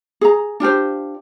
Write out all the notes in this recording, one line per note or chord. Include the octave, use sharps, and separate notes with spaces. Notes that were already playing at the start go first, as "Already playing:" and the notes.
G#4 A#5
D4 F4 G4 C5